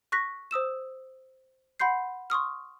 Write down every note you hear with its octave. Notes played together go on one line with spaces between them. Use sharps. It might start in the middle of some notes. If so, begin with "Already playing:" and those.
C#6 F#6 A#6 B6
C5 D#6 E6 E7
F#5 B5 C6 G6 C7
C6 C#6 D#6 F6